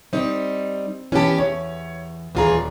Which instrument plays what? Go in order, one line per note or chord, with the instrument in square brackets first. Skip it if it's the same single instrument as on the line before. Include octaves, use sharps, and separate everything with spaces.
[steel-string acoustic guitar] G3 D#4 [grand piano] C4
[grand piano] E3 B3 A5 [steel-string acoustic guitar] C#4 G4
[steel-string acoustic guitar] E2 [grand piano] C#5
[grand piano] D#1 A#5 [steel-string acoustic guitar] E3 F4 G#4